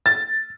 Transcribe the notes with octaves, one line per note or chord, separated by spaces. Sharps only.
A6